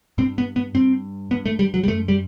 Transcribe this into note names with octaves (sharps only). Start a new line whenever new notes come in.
G2 C4
B3
B3
G2 C4
G2 B3
A3
G3
F#3
G3
F#2 A3
G3